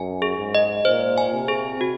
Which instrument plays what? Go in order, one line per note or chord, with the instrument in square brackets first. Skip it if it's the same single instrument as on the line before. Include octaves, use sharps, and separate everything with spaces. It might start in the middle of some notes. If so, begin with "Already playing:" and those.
Already playing: [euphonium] F#2 [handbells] G#5
[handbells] G#4
[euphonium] G#2
[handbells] D#5
[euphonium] A#2 [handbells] C5
[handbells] G#5
[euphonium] C3
[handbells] G#4
F#4